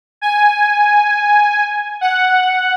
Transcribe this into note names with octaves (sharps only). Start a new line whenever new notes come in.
G#5
F#5